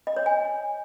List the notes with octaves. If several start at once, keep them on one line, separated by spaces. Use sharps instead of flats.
D#5
C#5
G#5